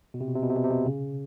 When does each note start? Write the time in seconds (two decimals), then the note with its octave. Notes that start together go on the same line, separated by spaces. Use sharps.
0.14 B2
0.21 C3
0.28 B2
0.35 C3
0.43 B2
0.49 C3
0.57 B2
0.64 C3
0.71 B2
0.86 C#3